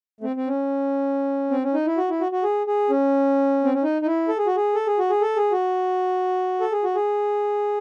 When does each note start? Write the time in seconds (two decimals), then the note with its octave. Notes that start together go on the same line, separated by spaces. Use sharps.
0.21 A3
0.24 C4
0.36 C4
0.47 C#4
1.51 C4
1.63 C#4
1.74 D#4
1.86 E4
1.97 F#4
2.10 E4
2.21 F#4
2.32 F#4
2.43 G#4
2.67 G#4
2.90 C#4
3.64 C4
3.74 C#4
3.83 D#4
4.02 D#4
4.06 E4
4.28 A4
4.38 G#4
4.47 F#4
4.56 G#4
4.75 A4
4.87 G#4
4.99 F#4
5.10 G#4
5.22 A4
5.36 G#4
5.52 F#4
6.61 A4
6.72 G#4
6.84 F#4
6.95 G#4